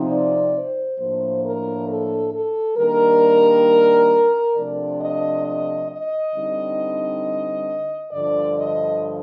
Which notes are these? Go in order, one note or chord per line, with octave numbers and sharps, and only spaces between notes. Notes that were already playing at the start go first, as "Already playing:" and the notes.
Already playing: C3 F3 C4 D#4
D5
C5
A2 F3 A#3 D4 C5
A#4
A4
A4
D#3 G3 A#3 D4 A#4
C3 F3 A3 D4 D5
D#5
D#5
D#5
D3 G3 C4 D#4
G2 D3 F3 D5
D#5